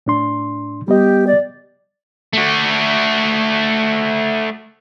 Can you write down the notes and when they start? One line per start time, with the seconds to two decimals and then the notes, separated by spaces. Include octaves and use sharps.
0.06 A2 D4 C6
0.88 G3 B3 G4 D#5
1.27 D5
2.33 A3 F#4